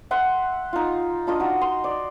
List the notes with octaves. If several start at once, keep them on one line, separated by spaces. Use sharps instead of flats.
E5 F#5 C6
D#4 F4
D4 F4 D#5
D#4 F#4
C6
D5